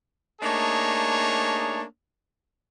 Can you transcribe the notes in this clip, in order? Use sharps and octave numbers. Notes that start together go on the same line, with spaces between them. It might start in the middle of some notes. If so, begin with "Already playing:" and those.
A3 A#3 D4 D#4 G#4 C#5